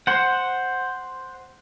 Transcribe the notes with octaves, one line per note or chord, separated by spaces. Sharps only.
C5 F#5